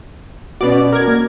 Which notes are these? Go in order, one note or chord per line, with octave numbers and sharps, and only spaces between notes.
B2 C#4 F#4 D5
A#4 G#6
A#3